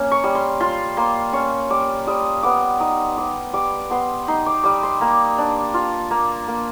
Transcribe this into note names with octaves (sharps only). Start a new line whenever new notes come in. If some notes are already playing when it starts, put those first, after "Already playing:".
Already playing: A#3 C#4
C#6
G3
C6
F4 C6
A#3 C6
C#4 C#6
G3 D6
G3 D#6
B3 D6
D#4 D#6
G3 D6
G3 D6
B3 C6
D#4 C6
D6
G3 D6
C6
A#3
D4
F4
A#3
A#3